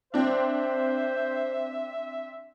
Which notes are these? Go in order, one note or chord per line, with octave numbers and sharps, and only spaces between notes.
C4 D4 C5 E5